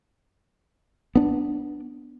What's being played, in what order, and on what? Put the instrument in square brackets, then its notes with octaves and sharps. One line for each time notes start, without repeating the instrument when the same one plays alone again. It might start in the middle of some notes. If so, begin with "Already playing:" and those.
[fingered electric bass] B3 D4